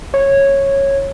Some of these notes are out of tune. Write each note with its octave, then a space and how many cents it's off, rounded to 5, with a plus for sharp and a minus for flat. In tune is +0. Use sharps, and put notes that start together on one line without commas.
C#5 -10